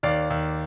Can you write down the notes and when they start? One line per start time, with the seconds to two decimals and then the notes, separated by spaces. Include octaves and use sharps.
0.03 D#2 D5 F5
0.30 D#2